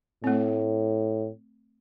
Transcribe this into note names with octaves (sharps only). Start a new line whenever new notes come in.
A2 A3 C4